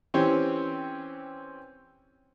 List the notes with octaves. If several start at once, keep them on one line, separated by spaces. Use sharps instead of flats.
E3 C4 C#4 G4 C5 C#5